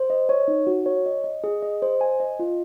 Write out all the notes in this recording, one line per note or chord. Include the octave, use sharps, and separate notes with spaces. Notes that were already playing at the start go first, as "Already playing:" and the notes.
Already playing: C5
D#5
C#5
D#4
F#4
C#5
D#5
D#5
G#4
D#5
C5
G#5
D#5
F4